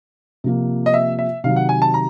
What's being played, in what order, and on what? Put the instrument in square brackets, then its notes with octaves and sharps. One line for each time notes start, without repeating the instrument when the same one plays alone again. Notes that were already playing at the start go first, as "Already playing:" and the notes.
[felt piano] C3 F3 A#3
[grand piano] D#5
E5
E5
[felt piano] C3 D#3 F#3 [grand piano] F5
[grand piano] F#5
G#5
A5
A#5